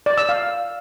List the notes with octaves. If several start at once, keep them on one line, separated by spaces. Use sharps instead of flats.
D5
E6
F5